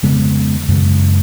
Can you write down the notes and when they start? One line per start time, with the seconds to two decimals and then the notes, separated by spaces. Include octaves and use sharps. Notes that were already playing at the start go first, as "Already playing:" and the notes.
0.03 F2 C#3 G#3 B3
0.68 F#2 C#3 G#3